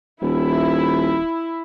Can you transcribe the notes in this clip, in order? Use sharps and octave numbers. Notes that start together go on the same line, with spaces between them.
D#1 E4